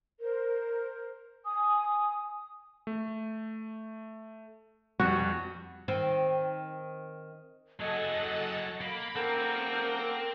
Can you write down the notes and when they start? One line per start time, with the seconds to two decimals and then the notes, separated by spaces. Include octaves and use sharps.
0.20 A#4 C5
1.46 G#5 D#6
2.87 A3
4.99 F2 G3 F#4
5.88 D#3 C4
7.81 F#3 G#4 A4 D#5 F#5
8.81 A#3 B5
9.16 A#3 C4 A4 A#4 F#5 G6